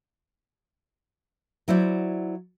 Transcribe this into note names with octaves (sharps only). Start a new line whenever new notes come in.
F#3 E4 C5 D5